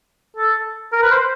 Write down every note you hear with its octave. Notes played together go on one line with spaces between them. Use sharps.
A4
A#4
B4
C5